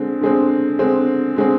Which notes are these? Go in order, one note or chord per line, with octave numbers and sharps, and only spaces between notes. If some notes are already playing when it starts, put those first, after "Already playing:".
Already playing: D3 G#3 C4
D3 G#3 C4
D3 G#3 C4
D3 G#3 C4